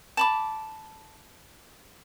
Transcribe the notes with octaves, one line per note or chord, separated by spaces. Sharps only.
A5 B5 D6